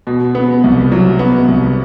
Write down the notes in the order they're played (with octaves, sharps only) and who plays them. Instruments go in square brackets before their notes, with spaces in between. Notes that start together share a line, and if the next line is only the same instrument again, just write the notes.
[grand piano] B2
B3
C2
F#3
B3
C2